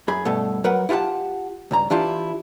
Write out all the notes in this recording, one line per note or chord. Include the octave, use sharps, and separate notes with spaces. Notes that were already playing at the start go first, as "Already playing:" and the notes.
F#2 G#4 B5
G2 B2 A3
F#3 A#4 B4 F#5
E4 F4 G4 F#5 A5
C#2 G2 A#5
E3 D4 E4 F4 G4